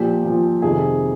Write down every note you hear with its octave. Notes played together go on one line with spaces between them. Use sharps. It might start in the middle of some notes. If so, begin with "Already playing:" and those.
Already playing: A#2 F3 G4
A#2 F3
F2 C3 D#3 G#4